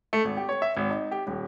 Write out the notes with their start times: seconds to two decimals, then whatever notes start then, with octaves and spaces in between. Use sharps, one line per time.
0.13 A3
0.25 G#1
0.37 G4
0.49 C#5
0.62 E5
0.77 G#1
0.91 D#4
1.11 G4
1.27 D#1